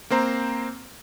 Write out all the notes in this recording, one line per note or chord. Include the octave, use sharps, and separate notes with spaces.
A#3 C4 C5 A#5